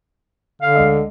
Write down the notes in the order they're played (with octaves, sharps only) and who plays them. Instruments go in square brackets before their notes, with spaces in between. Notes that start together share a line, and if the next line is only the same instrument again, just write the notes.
[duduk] D3 [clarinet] F5
[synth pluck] D2 G#3 D#5